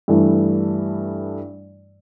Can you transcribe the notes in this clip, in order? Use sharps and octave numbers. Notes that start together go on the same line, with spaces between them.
G2 E3 A3